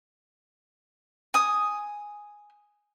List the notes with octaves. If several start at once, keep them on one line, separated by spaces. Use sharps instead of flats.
G#5 D#6